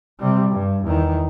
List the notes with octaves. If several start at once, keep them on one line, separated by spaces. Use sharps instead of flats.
C3 G3
G2
E2 D#3